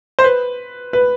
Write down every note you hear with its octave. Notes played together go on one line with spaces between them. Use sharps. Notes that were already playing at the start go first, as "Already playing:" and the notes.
C5
B4
B4